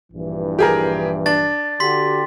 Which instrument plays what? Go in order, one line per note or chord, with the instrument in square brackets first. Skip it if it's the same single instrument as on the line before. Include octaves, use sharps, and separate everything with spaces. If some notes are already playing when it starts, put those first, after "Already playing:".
[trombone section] A#1 G2 E3
[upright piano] G4 G#4 A#4
[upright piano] D4 [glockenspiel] A6
[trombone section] D3 F#4 G4 [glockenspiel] C6 B6